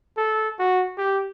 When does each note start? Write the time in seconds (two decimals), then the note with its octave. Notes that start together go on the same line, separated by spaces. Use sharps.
0.17 A4
0.59 F#4
0.98 G4